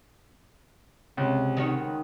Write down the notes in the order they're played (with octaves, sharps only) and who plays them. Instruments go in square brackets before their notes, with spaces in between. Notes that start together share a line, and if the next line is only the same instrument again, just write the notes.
[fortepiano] C#2 [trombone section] C3
[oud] D#3 F#4 C#5